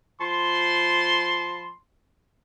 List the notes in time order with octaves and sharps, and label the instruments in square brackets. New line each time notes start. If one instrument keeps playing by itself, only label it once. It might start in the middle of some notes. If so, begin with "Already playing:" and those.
[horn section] F3 A5 B5 C6